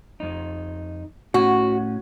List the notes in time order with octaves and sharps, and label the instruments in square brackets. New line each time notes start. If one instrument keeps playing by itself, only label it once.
[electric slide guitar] F2 D#4
[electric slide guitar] A2 C#4 [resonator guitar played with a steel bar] F#4